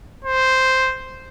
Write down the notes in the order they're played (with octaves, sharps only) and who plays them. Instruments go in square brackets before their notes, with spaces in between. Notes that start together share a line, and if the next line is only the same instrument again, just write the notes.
[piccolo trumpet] C5